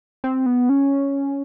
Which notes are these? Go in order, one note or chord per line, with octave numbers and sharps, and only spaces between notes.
C4
B3
C#4